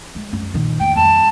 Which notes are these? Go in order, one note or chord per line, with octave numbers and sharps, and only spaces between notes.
G#3
F#2
A#2 D#3
A#1 F2 G5
F2 G3 A5